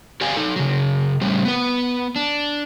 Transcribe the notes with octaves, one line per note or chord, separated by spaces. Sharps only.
G4 D5 F5 G#5
D#4 A4
C#3 F#3
A2 C#3 G3
B3 B4
D4